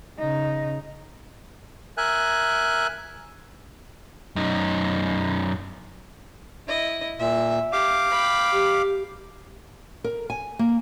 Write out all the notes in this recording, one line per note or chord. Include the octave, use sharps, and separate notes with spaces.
C#3 D#4
A#4 E5 G#5 F#6
F#2 D#4
E4 D#5
A#2 E5
G4 F5 D6
G5 B5
G4
A#4
G#5
A#3